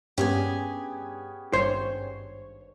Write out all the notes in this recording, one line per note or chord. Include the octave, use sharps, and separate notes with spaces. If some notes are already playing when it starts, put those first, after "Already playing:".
G2 B3 C#4 G4 G#4 G#5 G#6
G#1 G2 C5 C#5